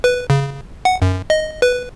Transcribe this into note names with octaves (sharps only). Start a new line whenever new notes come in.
B4
C#3
F#5
F#2
D#5
B4